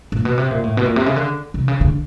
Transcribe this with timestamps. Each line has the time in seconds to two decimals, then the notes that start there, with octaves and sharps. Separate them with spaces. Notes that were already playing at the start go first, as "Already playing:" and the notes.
0.12 A#2
0.25 B2
0.38 C3
0.51 A#2
0.64 A2
0.77 B2
0.86 A#2
0.96 C3
1.06 C#3
1.16 D3
1.54 C3
1.68 C#3
1.81 D3